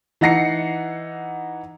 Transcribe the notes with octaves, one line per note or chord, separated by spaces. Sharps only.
E3 D#4 F#5 A#6 C7 C#7